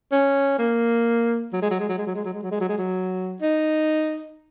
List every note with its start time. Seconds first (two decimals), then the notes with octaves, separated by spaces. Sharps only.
0.12 C#4
0.59 A#3
1.53 F#3
1.62 G#3
1.71 F#3
1.80 G#3
1.89 F#3
1.98 G#3
2.07 F#3
2.15 G#3
2.25 F#3
2.33 G#3
2.43 F#3
2.51 G#3
2.60 F#3
2.69 G#3
2.78 F#3
3.41 D#4